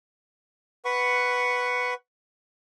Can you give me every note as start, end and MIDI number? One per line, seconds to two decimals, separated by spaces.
0.85 1.94 71
0.85 1.94 78
0.85 1.94 85